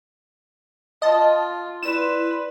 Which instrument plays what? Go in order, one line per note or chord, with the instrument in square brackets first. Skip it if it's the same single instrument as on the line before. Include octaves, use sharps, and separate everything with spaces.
[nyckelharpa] F4 [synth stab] D#5 A5
[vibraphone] E4 D5 C6 [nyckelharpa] B4 [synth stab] E7